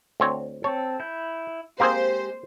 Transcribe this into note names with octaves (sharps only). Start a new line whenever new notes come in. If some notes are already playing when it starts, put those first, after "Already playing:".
D2 C4 C#5
C4 A4 C#5
E4 G6
G#3 A#3 C4 G4 G#4 C5 G6